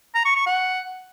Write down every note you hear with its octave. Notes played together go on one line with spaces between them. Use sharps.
A#5
C#6
C#6
F#5